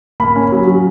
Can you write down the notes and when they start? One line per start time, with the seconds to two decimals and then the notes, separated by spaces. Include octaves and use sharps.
0.20 A#3 B5
0.36 C#4
0.52 F#3
0.67 F#3